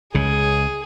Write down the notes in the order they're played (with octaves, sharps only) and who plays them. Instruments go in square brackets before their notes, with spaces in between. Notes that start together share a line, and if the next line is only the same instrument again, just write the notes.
[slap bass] C#2 C#3 [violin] G#4